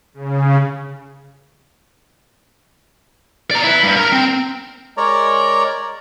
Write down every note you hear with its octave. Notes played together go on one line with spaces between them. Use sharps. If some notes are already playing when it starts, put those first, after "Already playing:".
C#3
D5 A#5
E4 B4
G2
A#4 A#5
C4
G#3 A#4 C#5 D5 A#5